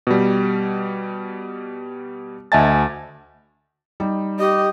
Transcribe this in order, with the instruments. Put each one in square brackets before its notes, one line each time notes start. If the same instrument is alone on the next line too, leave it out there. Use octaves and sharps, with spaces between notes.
[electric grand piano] B2 G3
D2 D#5 E5 G#5 A5 A6
[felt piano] G3 D#4
[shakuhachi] G4 [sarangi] D#5